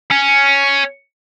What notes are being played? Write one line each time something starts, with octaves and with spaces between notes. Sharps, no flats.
C#4